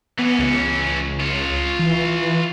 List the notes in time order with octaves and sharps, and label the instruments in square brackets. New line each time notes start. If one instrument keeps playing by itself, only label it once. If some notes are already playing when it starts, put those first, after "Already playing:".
[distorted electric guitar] E3 C#4 [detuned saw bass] B3
[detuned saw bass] C#2
[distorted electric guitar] F4 C#5
[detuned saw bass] E3